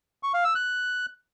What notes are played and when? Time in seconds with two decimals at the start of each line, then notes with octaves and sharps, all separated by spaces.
0.23 C#6
0.34 F5
0.44 E6
0.55 F#6